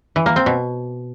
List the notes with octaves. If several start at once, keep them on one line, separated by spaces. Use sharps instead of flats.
E3
A#3
C4
B2